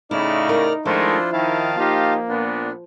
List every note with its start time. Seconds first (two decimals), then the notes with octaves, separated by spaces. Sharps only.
0.11 A2 C#3 D#4 E4 D5 F6
0.49 A#4
0.85 D#3 F3 G#3 A3 D4 E4 F4 C5
1.32 D#3 E4 F5 A5
1.77 A#3 D#4 F4 G4
2.29 A#2 B3 D4